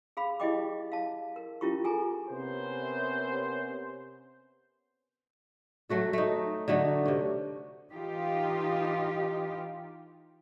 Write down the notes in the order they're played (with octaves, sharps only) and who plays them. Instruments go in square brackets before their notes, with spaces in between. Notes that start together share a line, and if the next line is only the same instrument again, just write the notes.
[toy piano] G#4 F5 B5
E4 G4 G#4 D#5 G5 D6
F5 A5
A#4
C#4 E4 F4 G4 C#6
G#4 A4 G#5 A#5
[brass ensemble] C3 B3 C#4 A#4 C5
[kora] F#3 A3 F#4 A4
A3 D#4
D3 F#3 A3 D#4
C3 C#4
[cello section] E3 D#4 F4 G4